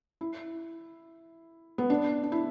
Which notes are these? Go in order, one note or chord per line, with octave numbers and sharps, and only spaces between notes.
E4
B3
D4
D4
E4